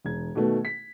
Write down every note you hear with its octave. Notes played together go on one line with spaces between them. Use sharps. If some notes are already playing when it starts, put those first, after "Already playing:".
E1 G#6
B2 D#3 A3 B3
B6